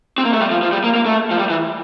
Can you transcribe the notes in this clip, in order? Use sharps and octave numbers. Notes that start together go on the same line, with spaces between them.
C4
A#3
A3
G3
F3
F3
G3
A#3
A#3
A3
F3
G3
E3